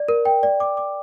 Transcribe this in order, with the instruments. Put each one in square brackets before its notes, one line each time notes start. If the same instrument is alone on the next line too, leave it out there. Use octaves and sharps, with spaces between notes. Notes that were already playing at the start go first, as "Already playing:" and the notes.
Already playing: [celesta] D5
A#4
G5
D5
D6
D6